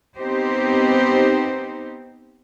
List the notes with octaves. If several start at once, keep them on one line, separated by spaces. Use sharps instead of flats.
B3 C4 D#4 G4 C5